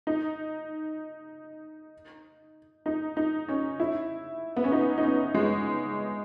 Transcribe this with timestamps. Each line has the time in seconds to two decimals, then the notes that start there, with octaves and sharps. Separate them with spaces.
0.07 D#4
2.86 D#4
3.17 D#4
3.49 C#4
3.80 E4
4.57 B3
4.64 C#4
4.72 D#4
4.98 D#4
5.03 C#4
5.35 G#3